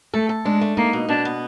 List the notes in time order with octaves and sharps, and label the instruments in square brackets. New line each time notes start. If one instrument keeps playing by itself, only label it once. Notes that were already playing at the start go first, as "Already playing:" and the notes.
[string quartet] A3 [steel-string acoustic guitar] A4
[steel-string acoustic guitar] A4
[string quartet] G#3 [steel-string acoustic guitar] D4
[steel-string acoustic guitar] A3
[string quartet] A#3 [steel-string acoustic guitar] D#4
[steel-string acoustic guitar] B2
[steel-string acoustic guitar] B2 [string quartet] D4
[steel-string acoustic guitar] B3